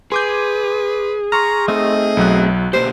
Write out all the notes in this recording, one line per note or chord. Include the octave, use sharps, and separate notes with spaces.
G#4 B4 C6 D6 G6
A#5 C6 C#6 F6
A3 C4 D#4 D#5
B1 F#3 F#6
B2 A#3 G4 C5